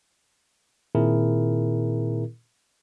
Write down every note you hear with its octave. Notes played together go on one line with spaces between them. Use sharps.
A#2 D#3 C4 E4 G#4 A#4